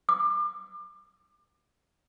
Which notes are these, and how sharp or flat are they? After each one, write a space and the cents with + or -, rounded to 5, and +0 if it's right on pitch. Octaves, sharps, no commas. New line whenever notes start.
D6 +30